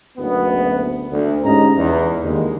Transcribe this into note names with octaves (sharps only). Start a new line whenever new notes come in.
F#1 D2 B3
D2
G#2 C#4 D#4 G4 D#5 A#5
E2
D#2 D3 G#3